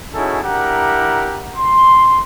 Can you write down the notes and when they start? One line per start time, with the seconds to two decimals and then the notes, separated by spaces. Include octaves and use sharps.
0.14 C#4 D#4 E4 F#4 G#4 A4
0.44 D4 E4 G4 A#4 F#5 A#5
1.57 C6